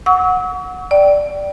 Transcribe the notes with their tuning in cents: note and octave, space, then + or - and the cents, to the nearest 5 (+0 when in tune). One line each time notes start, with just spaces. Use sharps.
F#5 -15 C#6 +40 E6 -40
D5 +0 G5 -25